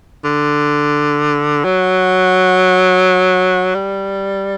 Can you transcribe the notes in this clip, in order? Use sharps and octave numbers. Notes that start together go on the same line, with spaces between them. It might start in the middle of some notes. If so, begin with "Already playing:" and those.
D3
F#3
G3